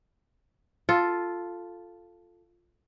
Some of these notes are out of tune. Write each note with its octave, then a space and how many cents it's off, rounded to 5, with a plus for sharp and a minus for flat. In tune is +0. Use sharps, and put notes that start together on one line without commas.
F4 +0 A4 +0